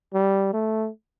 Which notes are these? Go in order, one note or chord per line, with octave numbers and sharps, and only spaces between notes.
G3
A3